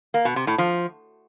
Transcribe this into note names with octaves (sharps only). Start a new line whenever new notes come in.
A#3
B2
C3
A2
F3